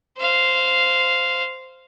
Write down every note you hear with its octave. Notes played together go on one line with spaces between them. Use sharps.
C5 F5